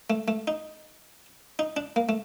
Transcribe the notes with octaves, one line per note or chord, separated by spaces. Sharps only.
A3
A3
D#4
D#4
D4
A#3
A3